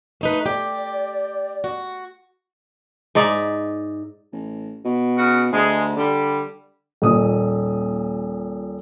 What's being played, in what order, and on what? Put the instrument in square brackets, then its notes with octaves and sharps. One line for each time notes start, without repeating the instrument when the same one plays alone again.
[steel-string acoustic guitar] A3 D#4 B4
[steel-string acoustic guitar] G4 [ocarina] D5
[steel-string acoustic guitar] F#4
[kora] G#2 D#4 D5 E5
[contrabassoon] A1
B2
[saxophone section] C#3 F#4
[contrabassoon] D2 [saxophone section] G#3
[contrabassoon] D3 [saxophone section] G3
[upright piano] D#1 A#2 D#6